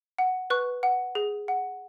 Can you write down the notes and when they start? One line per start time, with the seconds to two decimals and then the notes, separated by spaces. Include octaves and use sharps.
0.19 F#5
0.50 B4 C#6 F#6
0.83 F#5
1.15 G#4
1.48 F#5